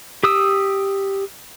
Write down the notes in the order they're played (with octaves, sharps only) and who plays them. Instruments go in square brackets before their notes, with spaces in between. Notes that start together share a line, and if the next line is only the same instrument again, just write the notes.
[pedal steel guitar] G4 D#6 E6